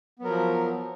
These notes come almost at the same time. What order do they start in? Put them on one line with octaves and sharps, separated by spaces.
B3 F#3 A#4 F3